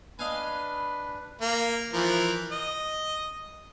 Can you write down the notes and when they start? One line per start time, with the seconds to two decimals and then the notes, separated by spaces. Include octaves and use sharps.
0.19 D4 B4 D#5 F5 G#5 B5
1.41 A#3
1.93 E3 F3 A#4
2.52 D#5